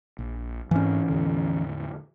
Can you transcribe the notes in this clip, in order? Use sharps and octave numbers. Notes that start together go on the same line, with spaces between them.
A#1
G#2 E3 C4 C#4
E2 A2 D3